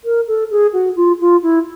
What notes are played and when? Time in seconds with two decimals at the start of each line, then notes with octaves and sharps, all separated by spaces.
0.04 A#4
0.27 A4
0.50 G#4
0.73 F#4
0.96 F4
1.20 F4
1.42 E4